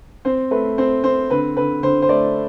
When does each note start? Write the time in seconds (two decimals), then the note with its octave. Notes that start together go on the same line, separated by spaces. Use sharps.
0.25 C4 C5
0.51 A3 B4
0.78 C4 C5
1.04 C4 C5
1.30 D3 B4
1.57 D3 B4
1.83 D3 C5
2.02 C5
2.09 A3 D5